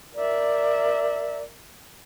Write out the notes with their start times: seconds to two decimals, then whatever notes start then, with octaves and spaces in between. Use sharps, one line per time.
0.15 A#4 D5 E5